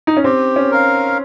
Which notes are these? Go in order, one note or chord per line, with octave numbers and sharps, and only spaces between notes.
D#4
C#4
C4 G4
C#4
A#4 F5